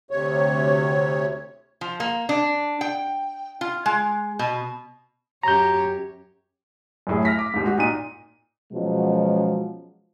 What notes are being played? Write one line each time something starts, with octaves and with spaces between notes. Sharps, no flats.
D2 C3 C#5
F3
A#3
D4
G5
F4
G#3
B2
F#2 G4 C#5 A#5 G6
F#2 A2 G#4
F6 A#6 B6
D6
D#1 G#2
F#4
A#2 D#4 D#7
B2 F3 F#3 G#3 C#4